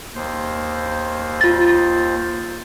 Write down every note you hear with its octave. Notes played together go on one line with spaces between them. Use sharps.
D#2 C5
F4 A6